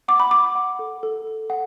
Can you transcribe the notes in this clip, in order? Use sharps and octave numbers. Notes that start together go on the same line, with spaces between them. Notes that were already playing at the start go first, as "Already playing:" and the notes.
F#5 D6
B5
F#5 D6
F#5
A4
A4
A4
F#5